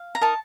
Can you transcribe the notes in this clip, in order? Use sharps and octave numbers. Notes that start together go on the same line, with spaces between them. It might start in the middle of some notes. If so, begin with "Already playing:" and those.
Already playing: F5
A#5
D#4 A#4 D#5 A5